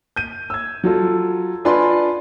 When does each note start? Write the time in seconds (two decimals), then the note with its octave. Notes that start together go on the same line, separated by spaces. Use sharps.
0.16 G6 D#7
0.50 E6 G#6
0.84 F#3 F4 A4
1.65 D4 F4 B4 D5 G#5 C6